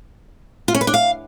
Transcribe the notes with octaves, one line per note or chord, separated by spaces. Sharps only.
F4
C#4
B4
D4
F5